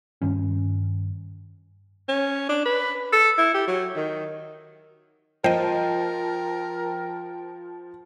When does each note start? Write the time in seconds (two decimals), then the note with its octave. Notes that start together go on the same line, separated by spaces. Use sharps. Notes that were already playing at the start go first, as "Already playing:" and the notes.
0.22 G2 D#3 C#4
2.08 C#4
2.49 D4
2.66 B4
3.12 A4
3.38 E4
3.54 G4
3.67 F#3
3.96 D#3
5.44 F3 A#4 C5 D#5 G5